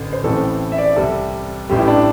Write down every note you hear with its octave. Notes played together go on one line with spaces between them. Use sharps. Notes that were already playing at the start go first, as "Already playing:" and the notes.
Already playing: A1 D3
C5
A1 A2 E3 C4 A4
E5
D5
C2 C3 G3 A4
A1 A2 G3 G4
E4
D4